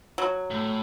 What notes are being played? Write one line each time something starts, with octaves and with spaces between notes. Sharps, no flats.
F#3
A2